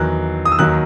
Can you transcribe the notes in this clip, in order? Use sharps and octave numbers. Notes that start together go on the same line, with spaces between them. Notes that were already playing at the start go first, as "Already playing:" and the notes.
Already playing: E2 D#3 F#3 F#6
D#6
E6
D#2 D#3 F#3 F#6